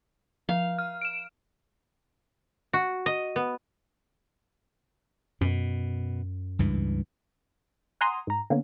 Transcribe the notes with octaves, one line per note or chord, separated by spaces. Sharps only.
F3 F5
F6
D7 E7
F#4
D#5
B3
F#2 B2
C#2 G2 E3
F#5 G#5 A#5 C6 D#6
G#2 A#5
D3 A#3 B3 C#4